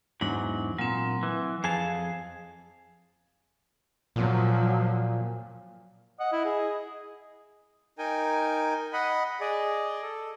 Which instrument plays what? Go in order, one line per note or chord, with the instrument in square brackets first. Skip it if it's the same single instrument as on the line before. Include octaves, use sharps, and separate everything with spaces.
[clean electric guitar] E2 G#2 F#3 [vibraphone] D4
[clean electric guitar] A#2 [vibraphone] F#3 C4
[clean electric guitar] E3
[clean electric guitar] F2 G#4 A5 [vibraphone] F5
[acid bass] A#2 [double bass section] F3 F#3
[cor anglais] D#5 [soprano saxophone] F#5
[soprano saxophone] E4
G#4
[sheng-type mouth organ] D#4 A#4 G5 G#5
D#5 F#5 B5
G#4 D5 D#5
A4